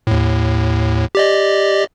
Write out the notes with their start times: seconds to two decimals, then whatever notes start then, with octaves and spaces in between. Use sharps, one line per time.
0.07 D#2 A2
1.15 G4 D5 D#5